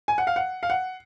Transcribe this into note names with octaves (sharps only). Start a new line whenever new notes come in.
G#5
F#5
F5
F#5
F5
F#5